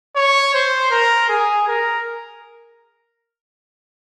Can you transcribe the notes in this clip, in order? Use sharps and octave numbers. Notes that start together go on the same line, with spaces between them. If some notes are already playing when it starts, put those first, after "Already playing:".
C#5
C5
A#4
G#4
A#4